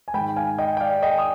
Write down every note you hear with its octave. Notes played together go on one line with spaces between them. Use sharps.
G#5
G#2 D#3 G5 B5
F5 G#5
D#5 G5
G5
D5 F5
D#5 G5
D#6